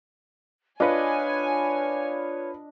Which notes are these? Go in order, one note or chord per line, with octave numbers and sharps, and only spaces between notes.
D4 F4 B4 C#5 D#5 G#5